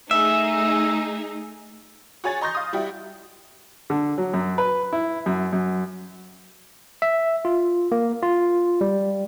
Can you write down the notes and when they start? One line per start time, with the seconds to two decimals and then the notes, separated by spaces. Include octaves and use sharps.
0.11 A3 D#4 G#4 E5
2.24 F#4 G#4 C#5 G#5 A6
2.41 D#5 A#5 C6 C#6 G6 A#6
2.55 F5 D#6
2.73 G3 E4 F#4 G4
3.90 D3
4.18 F#3
4.34 F#2
4.58 B4
4.93 E4
5.26 F#2
5.53 F#2
7.02 E5
7.45 F4
7.92 A#3
8.23 F4
8.81 G3